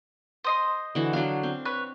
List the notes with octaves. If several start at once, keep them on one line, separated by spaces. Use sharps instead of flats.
C5 D#5 C6
D3 E3 F#4
F#3 D4 F5
C4
B4 C#5 F#6